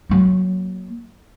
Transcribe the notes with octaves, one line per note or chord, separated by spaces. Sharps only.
F#3 A#3